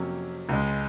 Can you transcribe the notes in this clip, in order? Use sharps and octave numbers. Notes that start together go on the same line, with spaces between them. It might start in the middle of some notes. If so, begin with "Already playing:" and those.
Already playing: F2 C3 F#3 A#3 C#4
C#2 C#3 G#3